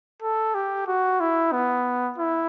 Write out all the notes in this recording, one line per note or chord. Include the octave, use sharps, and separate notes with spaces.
A4
G4
F#4
E4
B3
E4